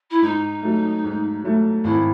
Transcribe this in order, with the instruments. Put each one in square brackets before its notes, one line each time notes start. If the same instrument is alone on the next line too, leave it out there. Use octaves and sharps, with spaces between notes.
[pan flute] E4
[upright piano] G#2 [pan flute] D#4
[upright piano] F#3 A3
G#2
F#3 A3
[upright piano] G#1 [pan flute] E4